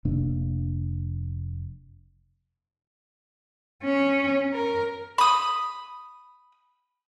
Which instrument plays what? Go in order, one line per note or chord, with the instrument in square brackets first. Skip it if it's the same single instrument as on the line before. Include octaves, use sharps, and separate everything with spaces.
[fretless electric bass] F1 C3 A#3 D4
[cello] C#4
A#4
[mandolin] B5 D#6